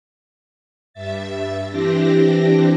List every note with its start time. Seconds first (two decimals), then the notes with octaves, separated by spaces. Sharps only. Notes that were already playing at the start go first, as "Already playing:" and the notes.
0.93 G2 E5 A6
1.68 E3 C4 D4 G4 A#6